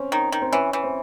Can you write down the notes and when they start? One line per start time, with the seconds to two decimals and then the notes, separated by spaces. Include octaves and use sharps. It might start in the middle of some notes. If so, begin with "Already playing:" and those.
Already playing: C4 C#4
0.12 D#3
0.32 D#3
0.42 C4
0.52 E3 C#4
0.73 E3
0.84 C4